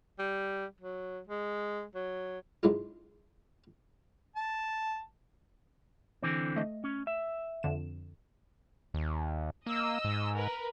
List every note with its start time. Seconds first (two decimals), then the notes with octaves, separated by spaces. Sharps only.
0.19 G3
0.81 F#3
1.27 G#3
1.95 F#3
2.63 G#2 G#3 D4 E4 F4
4.36 A5
6.22 D3 E3 C4
6.56 A3 D#5
6.84 C#4
7.07 E5
7.63 F2 D3 E7
8.94 D#2
9.66 A#3 D#5 E6
10.04 G#2
10.34 A#4 B4